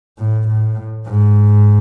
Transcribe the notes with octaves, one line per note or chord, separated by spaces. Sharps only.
A2
A2
G#2